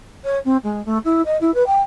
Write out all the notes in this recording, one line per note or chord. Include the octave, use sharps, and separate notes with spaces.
C#5
C4
G#3
A3
E4
D#5
E4
B4
G5